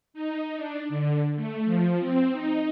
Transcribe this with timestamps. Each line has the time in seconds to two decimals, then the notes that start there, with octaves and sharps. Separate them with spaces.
0.14 D#4
0.56 D4
0.89 D3
1.36 A3
1.65 F3
1.99 C4
2.31 D#4